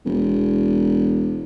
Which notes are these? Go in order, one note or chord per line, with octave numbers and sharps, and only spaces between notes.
E1